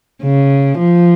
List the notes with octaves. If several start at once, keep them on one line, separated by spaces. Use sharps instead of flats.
C#3
F3